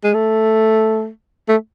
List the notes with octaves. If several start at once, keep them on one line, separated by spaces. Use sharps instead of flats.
G#3
A3
A3